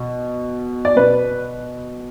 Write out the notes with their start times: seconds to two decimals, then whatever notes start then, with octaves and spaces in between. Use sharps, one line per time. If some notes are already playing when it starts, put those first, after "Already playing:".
Already playing: B2
0.85 D5
0.96 B2 B4